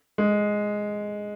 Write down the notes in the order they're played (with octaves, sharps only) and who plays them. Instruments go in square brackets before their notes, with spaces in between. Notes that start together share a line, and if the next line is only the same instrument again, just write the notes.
[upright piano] G#3